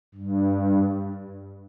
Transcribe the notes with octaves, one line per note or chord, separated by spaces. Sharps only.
G2